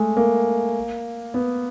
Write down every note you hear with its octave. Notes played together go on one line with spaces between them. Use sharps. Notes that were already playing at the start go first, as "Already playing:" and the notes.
Already playing: G#3 A3
A#3
B3